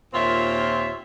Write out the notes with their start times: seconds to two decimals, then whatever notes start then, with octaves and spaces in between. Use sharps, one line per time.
0.14 D#2 A#2 C4 F4 C#5 E5